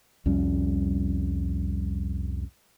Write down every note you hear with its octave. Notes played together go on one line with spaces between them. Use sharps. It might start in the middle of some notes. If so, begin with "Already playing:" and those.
C2 F2 G3 C#4